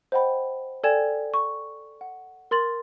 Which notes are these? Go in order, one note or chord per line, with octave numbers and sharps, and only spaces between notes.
C5 D#5 F#5 G5 B5
A4 D5 G5 G#5 G#6 E7
C#6
F#5
A#4 C6 A6 F#7